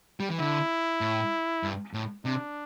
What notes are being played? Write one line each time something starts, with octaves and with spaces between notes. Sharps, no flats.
G3
E3
D3 E4
A2
G2
A2
C3 D4